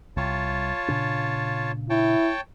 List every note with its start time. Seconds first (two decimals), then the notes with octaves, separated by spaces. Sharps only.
0.17 C2 F4 C#5 A5
0.88 A#2 C#3 D4
1.90 E4 C#5 G5 A5